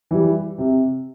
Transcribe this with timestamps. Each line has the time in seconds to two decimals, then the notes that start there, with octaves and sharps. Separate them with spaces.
0.11 E3 G3
0.58 C3